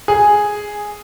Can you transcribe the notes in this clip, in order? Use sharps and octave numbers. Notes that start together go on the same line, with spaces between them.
G#4